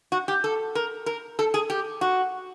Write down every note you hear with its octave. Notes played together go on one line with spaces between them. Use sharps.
F#4
G4
A4
A#4
A#4
A4
G#4
G4
F#4